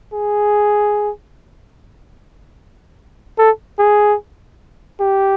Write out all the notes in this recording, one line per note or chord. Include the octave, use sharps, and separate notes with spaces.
G#4
A4
G#4
G4